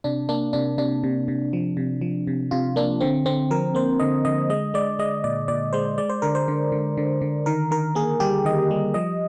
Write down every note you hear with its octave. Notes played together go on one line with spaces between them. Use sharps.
C3 D4
A#3 D4
C3 D4
C3 D4
C3
C3
F3
C3
F3
C3
C3 F4
A#3 D4
D3 C4
D3 C4
F3 A#4
A#3 C5
D3 D#5
D3 D#5
G#3 D#5
G#3 D5
G#3 D#5
A#2 D5
A#2 D5
G#3 C5
G#3 D5
C5
D3 A#4
C5
D3
D3
D3
D3
D#3 A#4
D#3 A#4
A#3 G#4
G3 G4
D#3 D#5
G3
F3 D#5